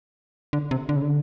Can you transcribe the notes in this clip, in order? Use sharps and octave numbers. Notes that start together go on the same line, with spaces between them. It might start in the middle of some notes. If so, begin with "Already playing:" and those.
D3
C3
D3
C#3
D3